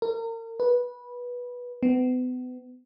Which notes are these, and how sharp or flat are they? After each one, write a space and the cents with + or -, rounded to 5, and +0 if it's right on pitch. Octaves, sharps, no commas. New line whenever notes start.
A#4 -35
B4 -15
B3 +35